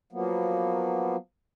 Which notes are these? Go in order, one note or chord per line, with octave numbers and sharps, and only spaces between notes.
F3 F#3 A#3 B3